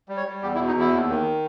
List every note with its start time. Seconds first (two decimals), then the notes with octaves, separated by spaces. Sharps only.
0.09 G3
0.17 C#5
0.26 G3
0.42 E2 G4
0.55 E4
0.59 B2
0.67 D#4
0.75 E2 E4
0.93 D#2
1.09 D#3